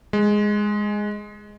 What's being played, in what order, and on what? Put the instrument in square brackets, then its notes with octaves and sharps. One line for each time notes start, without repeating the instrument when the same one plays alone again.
[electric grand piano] G#3